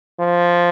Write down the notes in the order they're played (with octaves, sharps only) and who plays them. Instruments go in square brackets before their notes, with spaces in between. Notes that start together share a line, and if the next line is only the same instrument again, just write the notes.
[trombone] F3